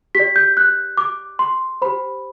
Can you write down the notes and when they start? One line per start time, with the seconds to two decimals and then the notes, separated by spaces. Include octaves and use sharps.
0.15 G4 D5 B6
0.36 G6
0.57 F#6
0.97 D6
1.39 C6
1.82 G4 C5 B5